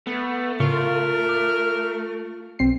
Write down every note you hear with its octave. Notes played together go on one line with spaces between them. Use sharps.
A3 B3
A2 C#3 F4 A#4 C#6
D6
B1 C4 C7